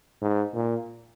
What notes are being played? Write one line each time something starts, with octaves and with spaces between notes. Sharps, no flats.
G#2
A#2